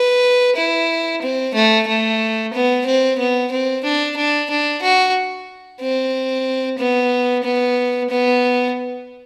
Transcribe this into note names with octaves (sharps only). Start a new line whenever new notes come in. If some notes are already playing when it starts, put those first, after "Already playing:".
Already playing: B4
E4
C4
A3
A3
B3
C4
B3
C4
D4
D4
D4
F#4
C4
B3
B3
B3